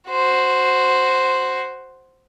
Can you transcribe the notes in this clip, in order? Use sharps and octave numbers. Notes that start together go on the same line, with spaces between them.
F#4 C5